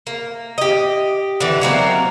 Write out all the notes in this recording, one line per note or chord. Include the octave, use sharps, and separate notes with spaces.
A#3
G4 D#5
D3 E3
F#3 A#3 C4 A#4